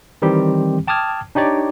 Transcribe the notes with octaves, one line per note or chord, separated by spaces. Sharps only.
D#3 E3 G3 C4 G4
G5 A5 D6 D#6 F6 G#6
D4 D#4 G4 C#5 D5